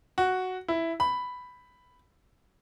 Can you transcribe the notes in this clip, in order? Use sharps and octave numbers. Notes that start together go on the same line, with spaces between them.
F#4
E4
B5